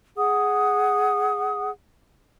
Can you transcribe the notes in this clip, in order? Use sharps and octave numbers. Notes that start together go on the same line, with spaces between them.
G#4 F#5 D#6